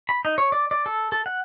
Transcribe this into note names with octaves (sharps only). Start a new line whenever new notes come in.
B5
D#4
C#5
D5
D5
A4
A4
F#5